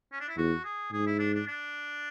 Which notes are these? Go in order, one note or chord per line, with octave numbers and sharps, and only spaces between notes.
C#4
D4
E4
E2 F#4
G#4
G#2 G#4
E4
D4
D4
D4